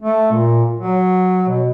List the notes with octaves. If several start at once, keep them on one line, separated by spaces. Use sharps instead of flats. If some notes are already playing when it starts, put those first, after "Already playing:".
A3
A#2
F#3
B2